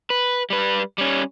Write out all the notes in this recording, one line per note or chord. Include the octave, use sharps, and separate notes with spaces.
B4
G3 B4
G3 C#4